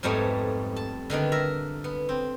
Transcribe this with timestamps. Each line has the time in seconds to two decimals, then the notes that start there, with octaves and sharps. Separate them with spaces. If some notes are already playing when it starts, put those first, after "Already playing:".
0.03 F2 G#2 G3 A3 B3 C#5
0.76 A5
1.10 D3 D#3 B3 D4
1.32 A#4 E5 A#5
1.84 B3
2.09 C4